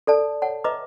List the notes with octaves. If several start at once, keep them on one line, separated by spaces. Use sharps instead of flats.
A4 D5 A5
C#5 F#5 A5
B4 D#5 E5 A#5 D6